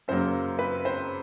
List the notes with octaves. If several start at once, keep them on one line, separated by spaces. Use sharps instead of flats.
F#2 C#3 F#3 A#3 C5
B4
C5